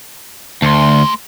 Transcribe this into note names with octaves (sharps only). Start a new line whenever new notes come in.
D2 A3 C6